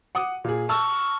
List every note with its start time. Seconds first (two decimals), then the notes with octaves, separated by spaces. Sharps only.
0.15 F#5 D6 D#6
0.44 A#2 G#4
0.69 A5 C#6 E6 F6